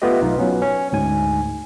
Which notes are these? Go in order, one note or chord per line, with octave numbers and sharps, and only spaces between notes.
A3 B3 F4 G4 D#5
B1 D#4 F4
F#3 B3 C#4
C#4
D2 G#2 G#5